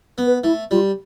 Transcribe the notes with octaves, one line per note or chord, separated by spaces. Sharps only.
B3
B4
A3 E4
G3 F4